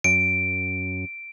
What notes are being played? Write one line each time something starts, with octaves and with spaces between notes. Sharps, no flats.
F#2 D7